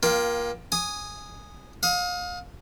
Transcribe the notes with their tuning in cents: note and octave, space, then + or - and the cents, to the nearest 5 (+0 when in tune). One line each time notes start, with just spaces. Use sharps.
A#3 +25 F4 +5 G5 +0
G#5 +0 D#6 -10
F5 +35 D#6 +30